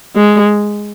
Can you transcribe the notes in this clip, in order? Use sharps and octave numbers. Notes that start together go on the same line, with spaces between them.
G#3